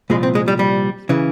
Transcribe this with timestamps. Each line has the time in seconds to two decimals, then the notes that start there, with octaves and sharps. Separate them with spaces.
0.10 C2 A#2 F3 G#3
0.23 C4
0.35 G#3
0.48 G3
0.59 G3
1.09 C#3 E3